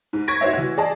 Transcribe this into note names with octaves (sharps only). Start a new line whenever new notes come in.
G#2
C#6 G#6 A#6 B6 D7
D#4 F#4 C5 C#5 E5
E3 F#4
G#4 D5 D#5 A5